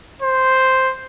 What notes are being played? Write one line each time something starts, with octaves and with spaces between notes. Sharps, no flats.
C5